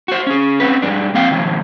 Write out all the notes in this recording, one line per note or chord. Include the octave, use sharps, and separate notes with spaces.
F#4 C5
C#4 G#4
C4 C#4 D#4 B4
G2 G#3 D4
A#3 C4 F5 G5
D#3 F3 G#3